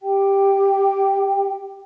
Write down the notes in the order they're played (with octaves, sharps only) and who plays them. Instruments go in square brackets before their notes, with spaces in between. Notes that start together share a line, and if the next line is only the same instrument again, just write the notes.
[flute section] G4 G5